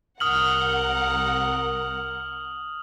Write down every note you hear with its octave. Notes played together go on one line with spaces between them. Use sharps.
C2 A#4 F#5 D#6 F6 F#7